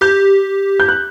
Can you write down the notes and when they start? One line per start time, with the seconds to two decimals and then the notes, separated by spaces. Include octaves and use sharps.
0.01 G4 G6
0.80 G6
0.88 F#6